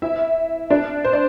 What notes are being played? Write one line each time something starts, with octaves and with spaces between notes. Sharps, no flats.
E4 E5
D4 D5
C5
D5